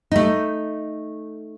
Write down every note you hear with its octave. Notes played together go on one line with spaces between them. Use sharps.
A3 D#4